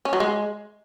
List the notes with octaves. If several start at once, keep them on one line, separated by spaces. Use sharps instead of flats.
C#4
F#3
G#3